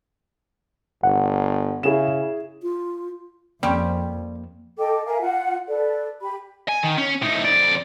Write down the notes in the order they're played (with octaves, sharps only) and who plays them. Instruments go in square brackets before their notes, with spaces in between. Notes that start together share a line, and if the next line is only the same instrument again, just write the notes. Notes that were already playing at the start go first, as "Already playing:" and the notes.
[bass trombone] G1 [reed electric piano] F#5
[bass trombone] C#3 [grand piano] E4 G#4 E7
[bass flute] F4
[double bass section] F2 [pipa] G3 [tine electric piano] A#3 [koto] C4 C#4 G4
[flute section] A4 D#5 G5 D6
A#4 E5 F5 G#5
F4 F#5
A4 B4 D5
G4 B5
[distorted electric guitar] G#5
D#3
C#4
A2 D#4
F2 D5